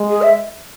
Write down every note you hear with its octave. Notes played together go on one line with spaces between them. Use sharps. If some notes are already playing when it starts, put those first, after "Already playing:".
Already playing: G#3
G#4
E5